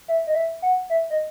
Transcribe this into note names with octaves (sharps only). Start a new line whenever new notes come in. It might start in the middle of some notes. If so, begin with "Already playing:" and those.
E5
D#5
E5
F#5
E5
D#5